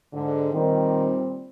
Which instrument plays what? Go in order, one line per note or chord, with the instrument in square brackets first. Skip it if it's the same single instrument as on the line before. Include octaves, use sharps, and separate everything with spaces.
[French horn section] G#2 D3
[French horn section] A#2 G3 C4 [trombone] D#3